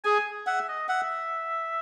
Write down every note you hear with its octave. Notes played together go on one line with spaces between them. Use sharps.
G#4 G#5
E5 F#5
D#5
E5 F#5